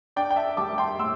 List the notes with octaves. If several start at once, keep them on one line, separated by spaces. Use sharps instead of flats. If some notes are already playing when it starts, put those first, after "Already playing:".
D4 D5 G5
G5
E5 A5
G3 A5 D6
G5 C6
A2 C6 E6